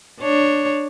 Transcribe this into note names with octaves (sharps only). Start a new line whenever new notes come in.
D4 C#5